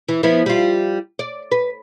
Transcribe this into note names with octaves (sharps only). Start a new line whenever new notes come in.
E3
F3 B3 E4
G3 F4
D5
B4